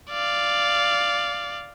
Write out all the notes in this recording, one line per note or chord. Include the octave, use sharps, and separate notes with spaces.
D5 F5